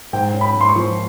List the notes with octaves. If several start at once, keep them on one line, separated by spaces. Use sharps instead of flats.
G#2 G5
C#4
B5
G#2
C6
C#6
F3